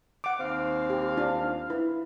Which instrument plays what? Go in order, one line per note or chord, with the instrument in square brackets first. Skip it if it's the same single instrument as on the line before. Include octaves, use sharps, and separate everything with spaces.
[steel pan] F#5 D6
[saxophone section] D#2 C4 F5
[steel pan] G4
D4 F4
E4 B4